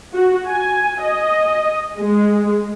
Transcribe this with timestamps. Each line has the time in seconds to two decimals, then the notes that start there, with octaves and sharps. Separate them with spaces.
0.14 F#4
0.49 G#5
1.03 D#5
1.98 G#3